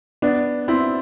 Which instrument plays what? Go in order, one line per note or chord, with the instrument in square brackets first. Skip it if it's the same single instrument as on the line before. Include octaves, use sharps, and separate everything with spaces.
[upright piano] B3 D4
C4 E4